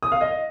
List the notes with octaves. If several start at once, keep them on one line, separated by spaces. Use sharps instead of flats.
D#6
F5
D#5